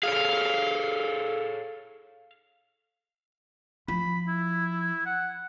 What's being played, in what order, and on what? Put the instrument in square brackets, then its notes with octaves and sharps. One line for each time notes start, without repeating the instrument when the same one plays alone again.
[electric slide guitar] G#4 A4 C#5 [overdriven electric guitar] F5
[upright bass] F3 [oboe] B5
[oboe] E4
F#5